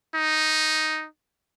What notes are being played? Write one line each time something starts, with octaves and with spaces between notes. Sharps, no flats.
D#4